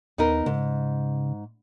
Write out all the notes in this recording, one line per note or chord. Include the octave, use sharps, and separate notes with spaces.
D#2 B3 D#4 A#4
G#2 C#3